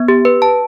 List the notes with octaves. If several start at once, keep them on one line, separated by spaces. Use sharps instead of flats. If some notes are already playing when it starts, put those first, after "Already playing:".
Already playing: B3
G4
B4
A5